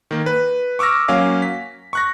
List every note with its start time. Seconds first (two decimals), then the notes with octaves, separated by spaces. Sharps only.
0.11 D#3 A#3
0.26 B4
0.79 C#6 D6 E6 F6 A#6
1.08 F#3 A#3 C#4 F5 G#5 D6
1.42 B6
1.93 C#6 F#6 A#6